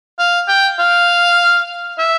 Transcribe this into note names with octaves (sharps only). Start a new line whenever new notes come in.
F5
G5
F5
E5